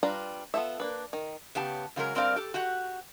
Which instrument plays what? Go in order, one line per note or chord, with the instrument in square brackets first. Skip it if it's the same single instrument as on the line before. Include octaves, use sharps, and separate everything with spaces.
[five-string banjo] G3 D4 F4 B4 A#5
B3 F4 A4 C5 E5
A#3 D4 B4
D#3
[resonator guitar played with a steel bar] C#3 B3 G4 A5
C#3 F#3 G#3 A#4
G2 C4 A#4 D5 F5
G4 A4
F#4 G4 F#5